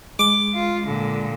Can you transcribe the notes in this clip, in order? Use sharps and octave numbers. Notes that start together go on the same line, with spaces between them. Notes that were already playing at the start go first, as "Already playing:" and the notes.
G#3 D6
F4
A#2 D3